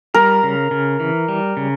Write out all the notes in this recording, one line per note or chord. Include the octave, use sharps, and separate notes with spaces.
G3 A#4
C#3
C#3
E3
G3
C#3